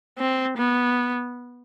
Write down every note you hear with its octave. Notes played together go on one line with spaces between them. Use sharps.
C4
B3